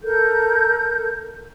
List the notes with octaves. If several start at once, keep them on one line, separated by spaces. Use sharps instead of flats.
A4 A#4 G6